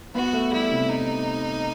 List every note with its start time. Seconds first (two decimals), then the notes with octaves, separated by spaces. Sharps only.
0.15 B3 F#4
0.33 A3
0.52 G3 E4
0.72 C3
0.90 D#4